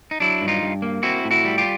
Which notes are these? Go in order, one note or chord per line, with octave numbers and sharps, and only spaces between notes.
D#4
F#3 D4 E4
G2
D#4 F4
G2
A#3
C4 E4 F#4
A2
E4 F#4
G3
F4 G4